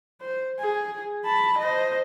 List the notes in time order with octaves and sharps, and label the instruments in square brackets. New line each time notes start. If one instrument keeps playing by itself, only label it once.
[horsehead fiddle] C5
G#4
A5 B5
C5 D#5